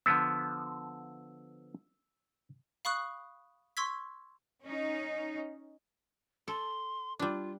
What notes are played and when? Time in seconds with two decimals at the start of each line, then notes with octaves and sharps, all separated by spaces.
0.06 D3 F3 B3 E6
2.85 F5 B5 C#6 D#6 F#6
3.77 C6 C#6 E6 G#6 B6
4.63 C#4 D#4
6.48 A4 C6
7.19 G3 D4 F4